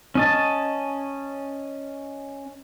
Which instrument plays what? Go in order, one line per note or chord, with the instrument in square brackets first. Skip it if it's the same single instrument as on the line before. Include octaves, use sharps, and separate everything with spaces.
[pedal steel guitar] C#4 D#5 A5